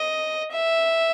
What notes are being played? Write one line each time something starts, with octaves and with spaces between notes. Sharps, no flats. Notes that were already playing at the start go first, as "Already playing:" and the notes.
Already playing: D#5
E5